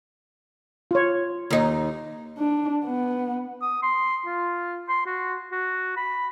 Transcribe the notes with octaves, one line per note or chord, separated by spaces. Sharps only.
F4 C#5
D#2 D#4
D4
B3
D#6
C6
F4
C6
F#4
F#4
B5